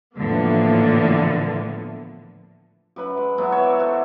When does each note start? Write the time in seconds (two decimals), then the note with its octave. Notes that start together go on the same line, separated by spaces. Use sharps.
0.16 A2 D3 E3 F3 A#3 B3
2.96 F#2 B4 B5
3.17 G#3
3.38 F#3 B3 E4
3.52 C#5 E5
3.64 D5
3.79 F#4 A4 C5